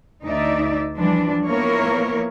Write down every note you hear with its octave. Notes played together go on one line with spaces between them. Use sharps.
D2 D#4 D5 E5
E3 F3 G3 D4
F3 A#3 B3 E4 A#4 C#5